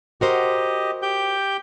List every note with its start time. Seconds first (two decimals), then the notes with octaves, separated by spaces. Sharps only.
0.21 F#4 G4 A#4 C5 D#5
1.02 G4 G5 G6